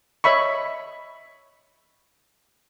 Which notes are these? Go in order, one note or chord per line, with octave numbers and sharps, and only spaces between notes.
C#5 D#5 E5 B5 C#6